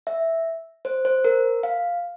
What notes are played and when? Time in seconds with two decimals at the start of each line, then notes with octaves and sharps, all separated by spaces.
0.07 E5
0.85 C5
1.05 C5
1.25 A#4
1.63 F5